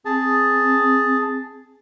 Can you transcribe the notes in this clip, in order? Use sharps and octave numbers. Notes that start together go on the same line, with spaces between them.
C4 G#4 A5